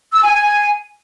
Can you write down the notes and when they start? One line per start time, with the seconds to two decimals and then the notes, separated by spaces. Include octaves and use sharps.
0.12 E6
0.22 G#5
0.33 G#5